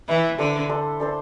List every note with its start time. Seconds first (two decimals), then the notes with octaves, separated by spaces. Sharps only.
0.08 E3 E4 B4 E5
0.38 D3 D4 A4 C5
0.69 D4 A4 C5
1.00 D4 A4 C5